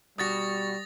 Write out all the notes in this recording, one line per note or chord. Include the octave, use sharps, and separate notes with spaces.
B2 G3 F#4 D#6 A6 A#6